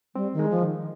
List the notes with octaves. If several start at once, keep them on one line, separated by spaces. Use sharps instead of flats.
G3 C4
D#3
G#3
F3
D#3